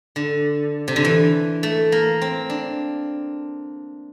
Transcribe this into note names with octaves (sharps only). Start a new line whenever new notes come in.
D3
C3
D3
E3
A3
A#3
C4
D4